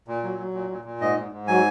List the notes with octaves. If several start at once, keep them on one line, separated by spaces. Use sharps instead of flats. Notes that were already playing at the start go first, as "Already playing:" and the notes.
A#2
F#3
F#3
A#2
A#2
A#2
G#2 D#5
G#2
G#2
F#3 G#5